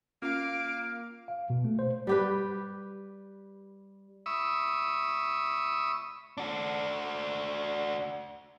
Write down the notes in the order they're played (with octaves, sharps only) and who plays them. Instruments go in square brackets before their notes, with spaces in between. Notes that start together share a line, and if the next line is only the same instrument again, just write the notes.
[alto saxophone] A#3 [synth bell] C#4 F4 [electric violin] F5 D7
[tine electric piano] F5
B2
A3
C5
[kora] G3 G4 B4
[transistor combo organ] E5 B5 C#6 D#6 E6
[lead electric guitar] D4 F#4